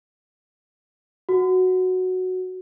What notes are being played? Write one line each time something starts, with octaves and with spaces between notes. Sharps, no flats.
F#4